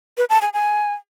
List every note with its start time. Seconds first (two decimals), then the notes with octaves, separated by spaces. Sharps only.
0.18 B4
0.30 A5
0.42 G#5
0.53 G#5